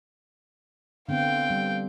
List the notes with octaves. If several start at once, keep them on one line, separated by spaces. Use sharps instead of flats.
D3 B3 C4 F5 G5
G3